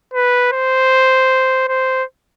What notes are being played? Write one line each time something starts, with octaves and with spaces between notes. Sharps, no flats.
B4
C5
C5